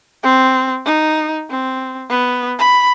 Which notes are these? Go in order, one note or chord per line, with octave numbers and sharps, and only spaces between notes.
C4
D#4
C4
B3
B5